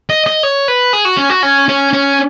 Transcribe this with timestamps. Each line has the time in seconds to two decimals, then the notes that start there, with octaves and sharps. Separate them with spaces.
0.10 D#5
0.26 D#5
0.43 C#5
0.68 B4
0.93 G#4
1.05 F#4
1.17 C#4
1.30 F#4
1.43 C#4
1.68 C#4
1.93 C#4